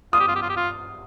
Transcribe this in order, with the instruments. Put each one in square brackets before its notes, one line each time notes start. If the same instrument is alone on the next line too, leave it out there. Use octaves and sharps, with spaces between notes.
[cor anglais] F4 [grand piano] D#6
[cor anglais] G4
F4
G4
F4
G4
F4